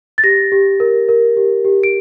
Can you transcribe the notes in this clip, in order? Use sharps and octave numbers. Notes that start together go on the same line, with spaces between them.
A6
G4 A#6
G4
A#4
A#4
G4
G4
D7